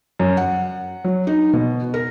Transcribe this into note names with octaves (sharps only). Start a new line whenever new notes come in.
F#2
F#5
F#3
D#4
B2
A#4